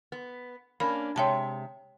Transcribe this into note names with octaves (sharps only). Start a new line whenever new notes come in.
B3
A#3 C#4 D4 B5
C3 G#3 C#5 E5 G5 A5